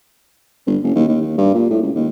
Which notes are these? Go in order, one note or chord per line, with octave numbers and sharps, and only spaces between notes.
G1
F#1
D#2
D#2
D#2
G2
A#2
A2
C#2
D#2